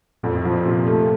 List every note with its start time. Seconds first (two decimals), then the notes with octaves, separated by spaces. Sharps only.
0.23 F2 A#2
0.36 A2
0.45 A#2 F3
0.66 C3
0.87 A3